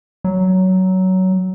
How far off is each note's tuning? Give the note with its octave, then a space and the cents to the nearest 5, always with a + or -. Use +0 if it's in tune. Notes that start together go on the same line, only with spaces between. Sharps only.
F#3 +15